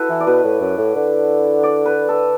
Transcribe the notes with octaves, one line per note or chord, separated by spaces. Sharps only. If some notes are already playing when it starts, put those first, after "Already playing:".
Already playing: E4 F#4 A4 B4
E3
D5
B2 B4
A2
F#2
A2
D3
D5
B4
A4